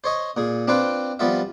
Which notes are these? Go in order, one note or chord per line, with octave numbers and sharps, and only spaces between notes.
C5 C#5 D#5
A#2 G#4
C4 D4 F4 B4 C5 G5
F3 G3 B3 F4 E5